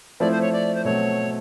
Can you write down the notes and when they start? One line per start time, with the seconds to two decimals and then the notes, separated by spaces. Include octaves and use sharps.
0.20 F3 A3 C4 E4 D5
0.31 C5
0.42 C#5
0.53 D5
0.75 C5
0.85 B2 F#3 A3 C4 C#5